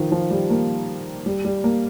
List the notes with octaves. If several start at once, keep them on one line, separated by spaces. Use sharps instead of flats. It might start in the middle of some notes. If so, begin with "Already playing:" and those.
Already playing: D#3 F3
F3
G3
A#3
G3
G3
A#3